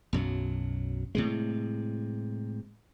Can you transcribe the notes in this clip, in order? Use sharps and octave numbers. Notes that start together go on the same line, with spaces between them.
B1 F#2 F#3
A2 C3 G#3